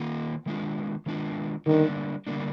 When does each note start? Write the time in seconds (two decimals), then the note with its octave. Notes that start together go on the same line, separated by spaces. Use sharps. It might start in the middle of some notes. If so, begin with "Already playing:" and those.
Already playing: D#3 A#3 F4
0.46 D#3 G#3 D4 F4
1.06 D#3 G#3 D4 F4
1.66 D3 D#3 G3 A#3 D4
2.27 D3 G3 A#3 D4